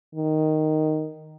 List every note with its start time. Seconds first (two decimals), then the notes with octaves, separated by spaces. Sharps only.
0.15 D#3